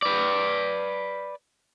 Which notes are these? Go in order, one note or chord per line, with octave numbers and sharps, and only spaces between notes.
B4 D5